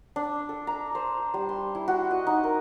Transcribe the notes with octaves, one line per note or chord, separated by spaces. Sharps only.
D4
A4
A#5
C5
G3
C6
E4
F#4
D#5
D#4
A#4